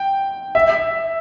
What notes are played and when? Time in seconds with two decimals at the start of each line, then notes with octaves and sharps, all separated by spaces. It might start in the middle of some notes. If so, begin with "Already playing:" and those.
Already playing: G5
0.55 E5